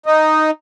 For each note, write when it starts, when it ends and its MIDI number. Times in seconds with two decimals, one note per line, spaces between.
0.06 0.51 63